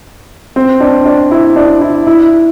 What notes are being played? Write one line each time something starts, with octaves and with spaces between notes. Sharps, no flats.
C4
D4
D4
E4
D4
E4
E4